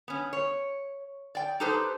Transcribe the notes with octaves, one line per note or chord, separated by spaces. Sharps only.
B3 C#4
C#5
D5 G5
D#4 G4 A4 B4 C5